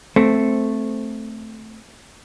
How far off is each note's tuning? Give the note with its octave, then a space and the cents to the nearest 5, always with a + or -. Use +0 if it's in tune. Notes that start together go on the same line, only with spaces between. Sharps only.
A3 +0 C4 +0